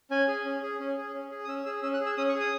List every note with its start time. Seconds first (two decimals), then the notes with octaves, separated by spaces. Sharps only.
0.11 C#4 G#5
0.28 G#4
0.45 C#4
0.63 G#4
0.80 C#4
0.98 G#4
1.14 C#4
1.31 G#4
1.45 D#6
1.48 C#4 E6
1.66 G#4 E6
1.83 C#4 E6
1.94 F#6
2.00 G#4
2.06 E6
2.17 C#4 D#6
2.29 C#6
2.35 G#4
2.40 D#6